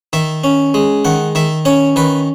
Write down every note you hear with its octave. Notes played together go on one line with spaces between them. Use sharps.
D#3 E5
C#4
G#3
D#3 F#5
D#3 E5
C#4 C#5
D#3 B4